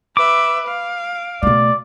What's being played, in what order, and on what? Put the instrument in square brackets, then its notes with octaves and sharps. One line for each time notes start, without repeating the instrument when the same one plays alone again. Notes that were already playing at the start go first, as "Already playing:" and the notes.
[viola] B4 E5 [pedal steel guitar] D6
[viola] F5
[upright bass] B2 A3 [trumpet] D5